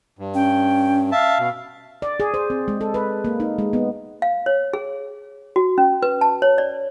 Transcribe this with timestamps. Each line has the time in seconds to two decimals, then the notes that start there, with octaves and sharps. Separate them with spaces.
0.19 G2
0.35 C#4 G5
1.12 E5 F5 A5
1.39 B2
2.02 D5
2.20 G#4
2.34 C5
2.50 C4
2.68 G#3
2.81 A4
2.94 B4
3.25 A#3
3.40 D#4
3.59 G#3
3.73 B3
4.22 F5
4.46 C#5
4.73 G#4
5.56 F#4
5.78 C#4
6.03 B4
6.21 A5
6.42 C#5
6.58 D5